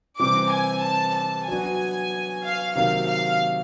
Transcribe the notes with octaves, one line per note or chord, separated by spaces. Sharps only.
C3 E3 G3 C4 D6
G#5
A5
A5
F#3 B3 D4 F#4 G#5
F5
C3 D#3 F#3 A#3 F5
F5